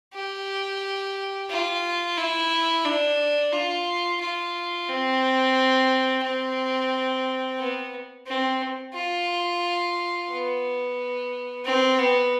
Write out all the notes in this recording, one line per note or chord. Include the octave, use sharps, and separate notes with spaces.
G4
F4
E4
D4
F4
F4
C4
C4
B3
C4
F4
B3
C4
B3